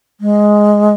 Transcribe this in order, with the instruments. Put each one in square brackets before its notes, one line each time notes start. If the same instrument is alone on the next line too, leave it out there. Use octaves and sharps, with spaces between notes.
[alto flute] G#3